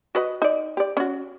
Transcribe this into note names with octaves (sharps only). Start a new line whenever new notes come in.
F#4 B4 D#5
D#4 D5
G4 D5
C#4 F#4